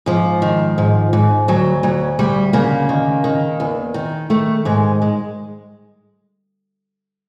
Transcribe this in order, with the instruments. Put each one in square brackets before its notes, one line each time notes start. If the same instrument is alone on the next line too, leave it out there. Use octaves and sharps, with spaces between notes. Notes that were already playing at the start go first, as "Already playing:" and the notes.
[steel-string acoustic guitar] G#2 F3
D#3
G#2
G#2
D2 F#3
D2 F#3
D2 G3
C#3 A#3
D#3
D#3
E2
D#3
D#3 A3
G#2 G#3
G#3